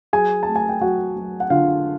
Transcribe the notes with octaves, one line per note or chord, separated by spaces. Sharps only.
F#3 G#4 G#5
A3 A5
G#5
G5
F#3 F#4 F#5
F#3
F#5
D3 F4 F5